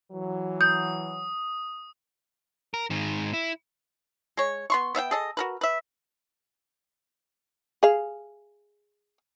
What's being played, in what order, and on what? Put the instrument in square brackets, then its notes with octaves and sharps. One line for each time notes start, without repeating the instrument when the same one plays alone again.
[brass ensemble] E3 F#3
[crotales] D#6 [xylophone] G6
[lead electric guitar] A#4
G#2 D#3
E4
[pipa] G#3 C#5
B3 C6 C#6
B3 E5 F5 G5
G#4 A4 D#5
F#4 A#4 B4
B4 E5
[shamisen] G#4 F5